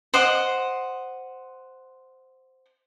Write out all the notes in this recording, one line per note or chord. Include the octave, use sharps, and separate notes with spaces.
C5 D#5 F#5 D6